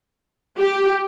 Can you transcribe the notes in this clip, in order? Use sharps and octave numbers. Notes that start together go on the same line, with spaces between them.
G4